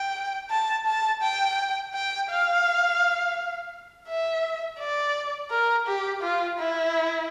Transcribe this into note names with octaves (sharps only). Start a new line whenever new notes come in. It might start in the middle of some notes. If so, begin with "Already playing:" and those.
Already playing: G5
A5
A5
G5
G5
F5
E5
D5
A#4
G4
F4
E4